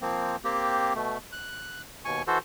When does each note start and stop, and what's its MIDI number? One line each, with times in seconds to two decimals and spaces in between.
0.02 0.36 53
0.02 0.36 58
0.02 0.36 60
0.44 0.94 58
0.44 0.94 60
0.44 0.94 67
0.95 1.18 47
0.95 1.18 57
1.32 1.82 90
2.05 2.22 39
2.05 2.22 47
2.05 2.22 80
2.05 2.22 85
2.27 2.38 52
2.27 2.38 66
2.27 2.38 69
2.27 2.38 72